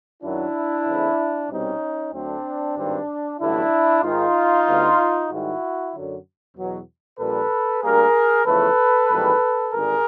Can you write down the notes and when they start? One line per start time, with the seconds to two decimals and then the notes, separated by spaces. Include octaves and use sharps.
0.22 F#2 D#3 F#3 D4 E4
0.86 E2 C#3 E3 A3 C4
1.50 C2 B2 G3 C4 C#4 D#4
2.12 D2 D3 F#3 A3 C4 D4
2.76 G#1 G2 D#3 G3 C4
3.39 A1 G2 D3 F#3 A3 D4 E4
4.02 G#2 D#3 G#3 D#4 F4
4.67 D2 D3 G3 B3
5.29 G#2 D#3 G3 E4 F#4
5.93 F#2 D3 F#3
6.57 E2 B2 F#3
7.19 A#1 A#2 G3 A4 B4
7.82 D2 D3 G3 A#3 G#4 A#4
8.46 E2 C#3 F3 A3 A4 B4
9.09 G#1 G#2 E3 G3 A#3
9.73 G#1 G2 D3 G#4 A#4